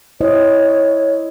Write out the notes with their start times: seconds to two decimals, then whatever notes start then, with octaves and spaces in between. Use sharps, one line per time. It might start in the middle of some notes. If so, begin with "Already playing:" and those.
0.21 E4 C5 C#5 D#5